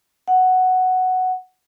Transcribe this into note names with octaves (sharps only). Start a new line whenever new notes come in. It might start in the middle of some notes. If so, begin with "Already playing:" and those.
F#5